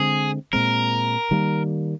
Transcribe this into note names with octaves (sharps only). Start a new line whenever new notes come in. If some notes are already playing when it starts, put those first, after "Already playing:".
Already playing: D3 G#3 C4 G#4
A#2 G#3 C4 A#4
D#3 G3 A#3